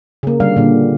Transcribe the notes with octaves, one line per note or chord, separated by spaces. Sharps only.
C#3 A#3
D3 G3 F5
A#2 D3